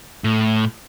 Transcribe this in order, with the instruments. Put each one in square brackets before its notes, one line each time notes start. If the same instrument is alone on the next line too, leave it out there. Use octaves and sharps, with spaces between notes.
[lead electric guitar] A2